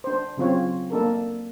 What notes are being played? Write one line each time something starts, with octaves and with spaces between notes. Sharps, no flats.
D4 C5
C#3 F#3 C4 F4 C#5
A#3 D4 A4 A#4